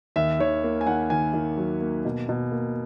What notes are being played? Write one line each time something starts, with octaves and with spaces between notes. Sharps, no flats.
D#2 E5
D#3 C#5
A#3
G#5
D#3 F#5
D#3 G#5
D#3
F#3
A#3
B2
B2
A#3